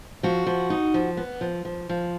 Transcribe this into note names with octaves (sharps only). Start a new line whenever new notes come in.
F3 F#4
F3
D#4
F3
B3
F3
F3
F3